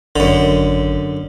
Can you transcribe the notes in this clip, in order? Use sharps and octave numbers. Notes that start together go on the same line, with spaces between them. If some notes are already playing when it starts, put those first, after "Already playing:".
G#1 F#2 D3